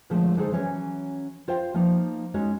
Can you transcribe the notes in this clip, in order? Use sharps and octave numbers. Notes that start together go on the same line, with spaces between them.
A#2 D3 F3 G#3 A3 C4
D3 G#3 D#4 G#4 A4 C5
E3 F#3 C#4 C#5
F4 C5 F5 G5
F3 A#3 B3 D#4
G#3 C#4 D#4 F#4 C#5